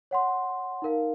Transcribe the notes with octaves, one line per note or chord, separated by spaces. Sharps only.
C#5 F#5 C6
D#4 A#4 F5